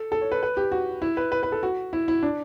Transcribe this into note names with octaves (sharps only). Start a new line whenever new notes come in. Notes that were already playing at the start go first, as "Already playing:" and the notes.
Already playing: A4
A4
C#5
B4
B4
G4
F#4
E4
B4
B4
B4
A4
F#4
E4
E4
D4